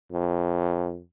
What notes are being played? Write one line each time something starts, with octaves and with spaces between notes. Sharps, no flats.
F2